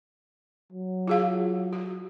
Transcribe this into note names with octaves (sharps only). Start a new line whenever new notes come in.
F#3
F4 G#4 F5
F#4